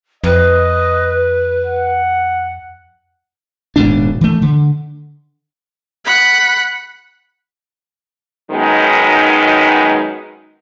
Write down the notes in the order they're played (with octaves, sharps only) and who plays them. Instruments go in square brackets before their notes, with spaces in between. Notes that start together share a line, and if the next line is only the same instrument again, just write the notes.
[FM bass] F2 [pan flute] B4 [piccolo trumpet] D#5
[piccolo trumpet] F#5
[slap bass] D#1 G#2 B2 D4
E3 A3
D3
[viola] F#5 B5
[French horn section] F#2 D#3 G#3 B3 D#4